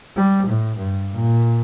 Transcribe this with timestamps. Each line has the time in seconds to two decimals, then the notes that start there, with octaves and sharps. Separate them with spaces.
0.16 G3
0.47 A2
0.77 G2
1.14 A#2